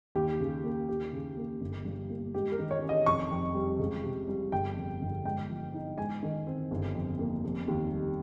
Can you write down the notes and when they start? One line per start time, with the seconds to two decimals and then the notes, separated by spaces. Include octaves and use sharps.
0.15 D#2 G4
0.40 C#3
0.64 A#3
0.89 D#2 G4
1.13 C#3
1.37 A#3
1.60 G1
1.85 G2
2.10 A#3
2.34 G#2 G4
2.52 A#4
2.59 D#3
2.71 C#5
2.82 C#4
2.89 D#5
3.06 F1 C#6
3.31 F2
3.55 G3
3.79 C#2
4.03 C3
4.28 G3
4.52 G1 G5
4.76 F2
5.01 G1
5.25 G#2 G5
5.49 F3
5.74 D#4
5.98 G#2 G#5
6.22 D#3
6.47 C4
6.71 G1
6.95 F2
7.19 A#3
7.44 F1
7.68 D#2
7.92 G3